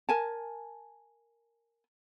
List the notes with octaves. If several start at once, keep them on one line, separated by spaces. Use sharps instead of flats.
A#4 G#5 A5